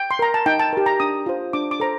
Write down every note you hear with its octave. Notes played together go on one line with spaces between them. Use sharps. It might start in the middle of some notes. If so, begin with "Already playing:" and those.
Already playing: G5
C6
A#4 A#5
A5
D#4 G5
A5
G4 A#4
A#5
D4 D#6
F4 C5
D4 D6
D6
A4 C5 A#5